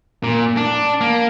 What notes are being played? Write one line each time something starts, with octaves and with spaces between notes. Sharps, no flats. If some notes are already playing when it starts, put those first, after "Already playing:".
A#2
D4
A#3